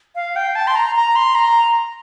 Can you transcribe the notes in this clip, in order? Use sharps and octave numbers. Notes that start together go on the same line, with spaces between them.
F5
G5
A5
C6
A#5
A#5
C6
A#5